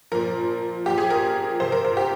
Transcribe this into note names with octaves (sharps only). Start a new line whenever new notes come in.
A#2 F3 A#4
A#2 F3 G4
G#4
A#4
C3 F3 C5
A#4
A#4
G4